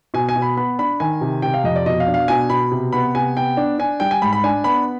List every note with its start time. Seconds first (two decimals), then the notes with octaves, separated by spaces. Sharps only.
0.14 B2 G#5
0.29 G#5
0.36 B2
0.42 B5
0.57 B3 B5
0.79 D4 B5
1.00 D#3 G#5
1.21 C3
1.42 C3 G5
1.54 F5
1.64 F2 D#5
1.76 D5
1.86 B2 D#5
2.00 F5
2.08 D4
2.14 F5
2.28 B2 G#5
2.50 B2 B5
2.71 C3
2.93 B3 B5
3.15 C3 G#5
3.37 B3 G5
3.57 D4
3.79 D4 G#5
4.00 G3 G5
4.11 G#5
4.22 G#2 B5
4.33 B5
4.44 D4 G#5
4.64 B3 B5